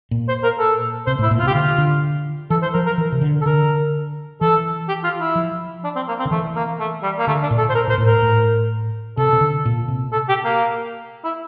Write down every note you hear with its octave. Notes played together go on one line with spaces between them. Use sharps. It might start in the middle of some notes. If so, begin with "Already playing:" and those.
A#2
C5
A#4
A4
C3 C5
A2
E4
A#2
F4
C3
G4
D3 F4
D3
E3 A4
C5
F3 A#4
A#4
E3
C3
D3
A4
D3 A#4
E3 A4
G4
F4
E4
F3
D4
C4
A#3
C4
D3
E3 A3
A#3
A3
G3
A#3
D3 A3
D4
A#2
A4
C5
A#4
A#2 C5
A2
A#4
A2
C3 A4
C3
D3
A#2
C3
A4
G4
A#3
E4